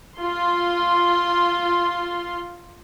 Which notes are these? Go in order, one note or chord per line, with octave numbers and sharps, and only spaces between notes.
F4 C6